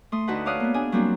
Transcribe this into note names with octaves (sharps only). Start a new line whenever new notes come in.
A3 C6 D#6
D2 D#4 F#4 B4 F#5 A5
A4 C#5 D5 F5 D#6 F#6
A#3 B3
D4 G#4 G#5
F#3 G3 A#3 C4 D4 F#4